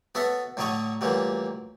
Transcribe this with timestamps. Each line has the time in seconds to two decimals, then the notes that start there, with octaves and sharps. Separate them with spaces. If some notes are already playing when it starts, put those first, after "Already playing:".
0.15 B3 F#4 A4 C#5 E5
0.57 A2 D3 F#3 C#5 D#5 C#6
1.01 D2 A#2 E3 F#3 G3